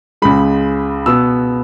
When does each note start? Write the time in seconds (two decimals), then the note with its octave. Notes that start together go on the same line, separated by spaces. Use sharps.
0.22 C#2 C#3 G#3 B5
1.06 B2 B3 E6